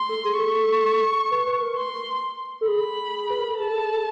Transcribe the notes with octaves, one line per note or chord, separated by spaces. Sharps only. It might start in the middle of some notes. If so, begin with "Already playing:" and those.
Already playing: C6
A4
G#4
G#4
A4 C#6
B4
B4
A#4
C6
A4
G#4 B5
B4
A#4
A4
G#4 A5
A4
G#4
A4